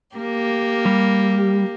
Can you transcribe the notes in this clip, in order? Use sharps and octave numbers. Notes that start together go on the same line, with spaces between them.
A#3 G4
G3